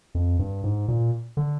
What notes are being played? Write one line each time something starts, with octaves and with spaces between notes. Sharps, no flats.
F2
G2
G#2
A#2
D3